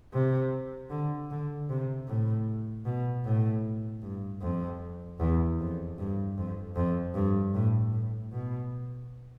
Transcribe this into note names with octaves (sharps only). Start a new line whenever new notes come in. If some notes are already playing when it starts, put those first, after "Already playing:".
C3
D3
D3
C3
A2
B2
A2
G2
F2
E2
F2
G2
F2
F2
G2
A2
A2
B2